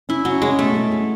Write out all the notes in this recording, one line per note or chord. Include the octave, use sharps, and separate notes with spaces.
C#4 E4
F#3 C#4
G#3 C#4
B2 A3
G#3
C#4